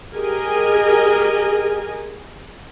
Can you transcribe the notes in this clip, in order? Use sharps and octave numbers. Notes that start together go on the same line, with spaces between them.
G4 G#4 A#4 D#5 G#5